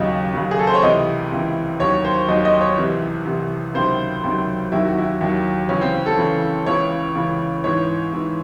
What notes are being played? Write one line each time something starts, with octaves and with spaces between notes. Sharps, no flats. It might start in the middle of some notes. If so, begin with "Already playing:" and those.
Already playing: D#2 C#3 F#3 D#5
D#2 C#3 F#3
G#4
A4
C5
C#5
C#2 C3 E3 D#5
C#2 C3 E3
D#2 D#3 F#3 C#5
C5
D#2 D#3 F#3 D#5
D#5
C#5
C2 C3 E3
C2 C3 E3
C#2 C3 D#3 F#3 C5
C#2 C3 D#3 F#3
D#2 D#3 F#3 E4
F#4
E4
D#2 D#3 F#3
C#2 C#3 E3 C#4
C4
A4
C#2 C#3 E3
C#2 C#3 E3 C#5
C#2 C#3 E3
G#2 E3 C#5
G#2 E3